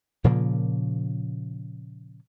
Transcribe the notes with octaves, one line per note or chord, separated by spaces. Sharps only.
A#2 C#3 F3 A#3